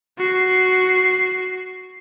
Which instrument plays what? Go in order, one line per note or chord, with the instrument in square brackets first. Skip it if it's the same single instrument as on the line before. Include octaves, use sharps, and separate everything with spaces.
[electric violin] F#4 C7